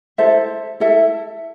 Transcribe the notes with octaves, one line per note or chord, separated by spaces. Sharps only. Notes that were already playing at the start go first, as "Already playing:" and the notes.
E4 A4 C5 E5
E4 A4 E5